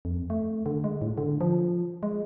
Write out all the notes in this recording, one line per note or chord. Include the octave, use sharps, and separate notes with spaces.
F2
A3
D3
G#3
A2
D3
F3
G#3